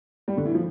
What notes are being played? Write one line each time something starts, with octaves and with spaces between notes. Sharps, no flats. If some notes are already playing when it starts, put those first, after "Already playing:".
G3
D3
E3
F3